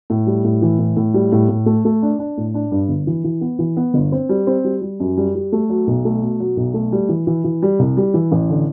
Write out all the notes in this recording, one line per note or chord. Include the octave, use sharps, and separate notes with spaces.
A2
G3
A2
E3
A2
A2
G3
A2
A2
A3
A3
D4
D4
A2
D4
G2
G1
E3
E3
B3
E3
B3
G1
C4
G3
C4
G3
G3
F#2
G3
G3
A3
F#3
B1
A3
B2
F#3
B1
A3
G3
E3
E3
E3
G3
C2
G3
E3
A1
D3